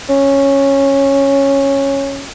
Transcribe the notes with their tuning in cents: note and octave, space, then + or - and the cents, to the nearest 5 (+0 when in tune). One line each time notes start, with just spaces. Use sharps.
C#4 -10